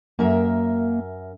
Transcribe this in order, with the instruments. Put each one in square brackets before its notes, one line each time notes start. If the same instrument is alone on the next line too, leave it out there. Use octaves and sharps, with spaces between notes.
[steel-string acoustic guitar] F#2 A#4 E5 [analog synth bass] A#3